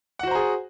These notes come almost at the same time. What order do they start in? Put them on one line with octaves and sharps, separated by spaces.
F#5 F#4 C5 A#5 G#4